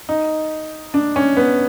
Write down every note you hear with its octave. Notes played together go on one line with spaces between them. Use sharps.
D#4
D4
C#4
B3